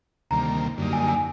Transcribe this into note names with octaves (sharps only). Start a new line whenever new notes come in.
D2 C3 D#3 G3 A#3 A#5
F#2 D3 G3 A#3 D#4
G#5
G#5